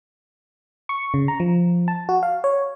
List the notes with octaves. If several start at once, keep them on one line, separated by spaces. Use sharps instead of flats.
C#6
C#3
A#5
F3
A5
F#4
F5
C#5